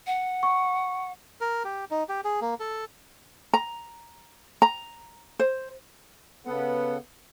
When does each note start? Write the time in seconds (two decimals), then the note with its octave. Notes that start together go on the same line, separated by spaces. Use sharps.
0.07 F#5
0.43 C#6
1.41 A#4
1.65 G4
1.91 D#4
2.09 G4
2.24 G#4
2.41 A#3
2.60 A4
3.54 A#5
4.62 A#5
5.39 C5
6.46 C#3 B3 A4 F#5